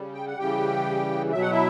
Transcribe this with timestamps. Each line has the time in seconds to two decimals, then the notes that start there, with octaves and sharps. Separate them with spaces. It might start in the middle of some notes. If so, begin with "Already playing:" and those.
Already playing: C#3 G3
0.13 G5
0.26 F#5
0.38 C#3 E3 G3 G4 G5
1.32 B2 F#3 E5
1.41 F#5
1.51 E4 E5